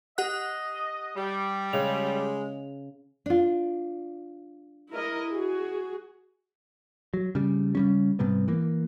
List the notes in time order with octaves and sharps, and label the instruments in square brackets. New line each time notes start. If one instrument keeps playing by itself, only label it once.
[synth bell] G4 F#5 F#6 [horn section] D#5
[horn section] G3
[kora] C#3 [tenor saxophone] G#3 [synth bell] F7
[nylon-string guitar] D4 F4
[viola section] E4 A#4 D#5
F#4 G#4
[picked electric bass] F#3
C#3 G3
C#3 G3 C#4
G#2 C3 G3 B3
E3 A#3